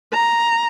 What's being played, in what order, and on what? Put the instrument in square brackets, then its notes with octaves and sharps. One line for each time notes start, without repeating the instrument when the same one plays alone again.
[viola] A#5